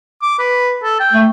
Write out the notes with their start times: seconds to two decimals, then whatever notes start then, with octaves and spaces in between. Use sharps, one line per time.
0.22 D6
0.39 B4
0.83 A4
1.00 G5
1.13 A3